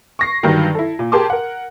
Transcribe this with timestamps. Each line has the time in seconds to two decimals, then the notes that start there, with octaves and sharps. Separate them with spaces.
0.19 C#6 A#6 C7
0.43 G2 D3 D#3 F#3
0.75 E4 A4
0.99 A#2
1.12 G4 G#4 A#4 A5 C6 D6
1.30 A#4 F#5